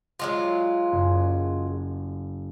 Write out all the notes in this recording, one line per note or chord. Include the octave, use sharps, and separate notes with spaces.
F#3 G#3 F4
F#1